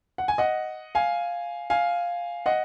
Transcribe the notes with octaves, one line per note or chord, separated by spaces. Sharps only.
F#5
G#5
D#5 F#5
F5 G#5
F5 G#5
D#5 F#5